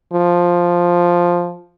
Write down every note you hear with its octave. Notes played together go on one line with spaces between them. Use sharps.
F3